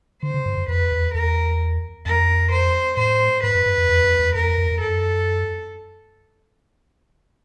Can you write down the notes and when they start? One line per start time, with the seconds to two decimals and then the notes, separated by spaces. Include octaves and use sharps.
0.23 D3 C5
0.34 C#3
0.46 G2
0.57 F#2
0.68 F2 B4
0.91 E2
1.14 E2 A#4
2.05 F2 A#4
2.51 C5
2.97 A2 C5
3.43 G#2 B4
3.55 F#2
3.66 G2
3.78 F2
3.89 E2
4.04 F2
4.20 E2
4.35 F2 A#4
4.58 F2
4.71 F2
4.80 F#2 A4